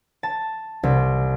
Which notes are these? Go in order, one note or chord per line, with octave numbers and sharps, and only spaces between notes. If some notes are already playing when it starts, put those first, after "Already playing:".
A5
C2